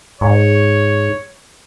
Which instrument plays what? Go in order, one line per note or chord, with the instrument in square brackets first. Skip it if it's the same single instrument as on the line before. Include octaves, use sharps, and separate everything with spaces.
[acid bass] G#2 [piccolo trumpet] C#5